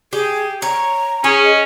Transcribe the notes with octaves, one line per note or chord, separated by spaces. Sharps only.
G4 G#4
C#5 A#5
C#4 G#4
D#5